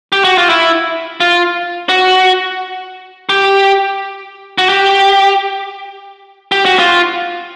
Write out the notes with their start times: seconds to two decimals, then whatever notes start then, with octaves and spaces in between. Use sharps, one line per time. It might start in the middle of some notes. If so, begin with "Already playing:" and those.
0.12 G4
0.24 F#4
0.38 F4
0.49 E4
1.20 F4
1.89 F#4
3.29 G4
4.58 F#4
4.69 G4
6.52 G4
6.66 F#4
6.79 F4